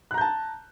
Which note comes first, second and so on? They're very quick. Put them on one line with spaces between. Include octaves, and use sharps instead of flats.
F#6 A#5 G6 A5